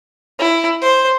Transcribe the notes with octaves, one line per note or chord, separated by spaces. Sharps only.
E4
C5